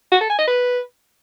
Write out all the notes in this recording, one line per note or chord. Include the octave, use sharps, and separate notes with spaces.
F#4
A4
G#5
D#5
B4